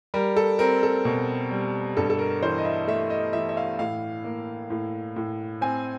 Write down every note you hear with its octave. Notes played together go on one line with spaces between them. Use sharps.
G3 A#4
A4
C4 A#4
A4
B2
G3
G2 A4
A4
A#4
E3 C5
D#5
E5
A3 E5
D#5
E3 E5
E5
F5
A2 F5
A#3
A2
A2
C4 G#5